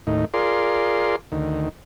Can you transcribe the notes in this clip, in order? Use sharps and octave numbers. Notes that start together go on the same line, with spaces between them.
D#2 A2 D#4
F4 G#4 A#4 D5 C6
D2 D#3